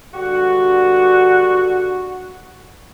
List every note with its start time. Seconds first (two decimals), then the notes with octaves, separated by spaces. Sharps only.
0.13 G2 D3 F#4